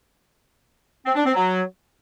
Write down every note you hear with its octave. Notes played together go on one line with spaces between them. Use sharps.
C4
D4
C4
F#3